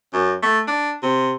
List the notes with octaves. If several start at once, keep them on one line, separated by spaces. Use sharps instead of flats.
F#2
A3
D4
C3